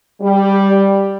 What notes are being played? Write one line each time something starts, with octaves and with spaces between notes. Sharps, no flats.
G3